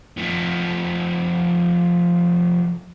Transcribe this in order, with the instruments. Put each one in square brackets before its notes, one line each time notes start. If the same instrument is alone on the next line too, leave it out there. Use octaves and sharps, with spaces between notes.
[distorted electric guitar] F3 A3